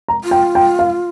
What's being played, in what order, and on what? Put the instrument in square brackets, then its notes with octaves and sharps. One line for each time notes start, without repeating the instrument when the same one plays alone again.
[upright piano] A#5
[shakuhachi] F4
[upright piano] G5
G5
F5